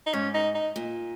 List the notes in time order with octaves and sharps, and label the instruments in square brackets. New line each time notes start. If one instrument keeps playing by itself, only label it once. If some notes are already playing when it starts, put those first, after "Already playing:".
[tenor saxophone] D#4
[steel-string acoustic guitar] G#2 [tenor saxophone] C#4
[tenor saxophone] D#4
D#4
[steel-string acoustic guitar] A#2